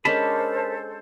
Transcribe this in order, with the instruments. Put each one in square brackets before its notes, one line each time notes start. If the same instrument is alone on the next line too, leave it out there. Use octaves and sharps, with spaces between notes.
[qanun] G#3 C#4 D4 [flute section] A4 C5 [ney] A#4 [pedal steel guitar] A5 B5